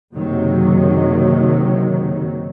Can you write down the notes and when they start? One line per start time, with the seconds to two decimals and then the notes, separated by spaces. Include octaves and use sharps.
0.13 F#1 C3 D#3 F#3